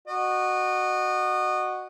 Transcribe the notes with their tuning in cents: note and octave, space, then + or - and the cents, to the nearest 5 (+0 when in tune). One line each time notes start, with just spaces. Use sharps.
F#4 +0 D#5 -30